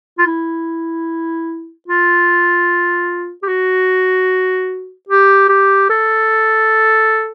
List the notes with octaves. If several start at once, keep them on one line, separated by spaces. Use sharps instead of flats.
F4
E4
F4
G4
F#4
G4
G4
A4